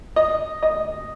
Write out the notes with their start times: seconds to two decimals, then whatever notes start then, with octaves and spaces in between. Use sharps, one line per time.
0.16 D#5
0.63 D#5